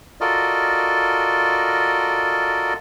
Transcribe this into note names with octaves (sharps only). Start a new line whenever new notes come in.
F4 F#4 A4 A#4 D5 D#5